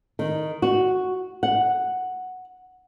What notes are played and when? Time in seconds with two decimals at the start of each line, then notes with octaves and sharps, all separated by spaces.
0.19 D#3
0.62 F#4
1.43 F#5